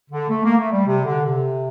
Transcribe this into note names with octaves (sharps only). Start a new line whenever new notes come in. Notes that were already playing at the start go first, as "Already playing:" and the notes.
D3
A3
A#3
A3
G3
C3
D3
C3